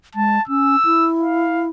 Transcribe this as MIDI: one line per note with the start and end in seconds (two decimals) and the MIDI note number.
0.15 0.38 56
0.15 0.42 81
0.48 0.76 61
0.48 1.10 88
0.85 1.70 64
1.21 1.66 77